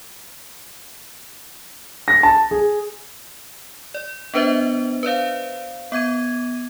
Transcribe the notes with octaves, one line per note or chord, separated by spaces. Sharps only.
A#6
A5
G#4
D5
B3 D4 B4 C5 D#5 E5
B4 C5 D5 F5
B3 D6 G#6 D#7